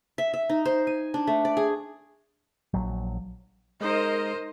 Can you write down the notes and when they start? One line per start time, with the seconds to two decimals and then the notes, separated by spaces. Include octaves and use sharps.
0.18 E5
0.34 E5
0.50 D#4
0.66 C5
0.87 G#5
1.14 D4
1.27 A3
1.45 D5
1.57 G#4
2.74 A#1 F#3
3.81 G#3 D#4 A#4 C5 D#5